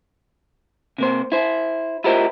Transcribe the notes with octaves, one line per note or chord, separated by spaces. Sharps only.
C3 A#3 C5
E4 C5
E4 F4 G4 A#4 C5 D#5